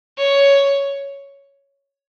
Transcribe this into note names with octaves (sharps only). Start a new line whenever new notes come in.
C#5